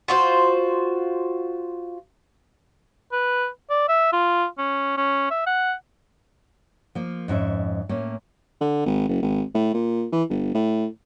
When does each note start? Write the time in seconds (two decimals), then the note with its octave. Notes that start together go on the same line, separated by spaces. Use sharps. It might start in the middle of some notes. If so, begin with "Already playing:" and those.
0.08 F4 F#4 C5
3.12 B4
3.70 D5
3.89 E5
4.13 F4
4.58 C#4
4.97 C#4
5.31 E5
5.47 F#5
6.95 F3 A#3
7.28 F2 G#2 C#4 E5
7.89 A2 A#3 C#4
8.61 D3
8.86 G#1
9.09 F#1
9.22 G#1
9.54 A2
9.74 A#2
10.12 E3
10.29 G1
10.55 A2